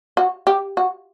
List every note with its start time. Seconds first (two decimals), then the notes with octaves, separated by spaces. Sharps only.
0.17 F#4
0.47 G4
0.77 F#4